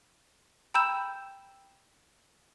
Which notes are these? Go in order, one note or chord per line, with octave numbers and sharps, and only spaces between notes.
G5 A#5 B5 E6 G6 E7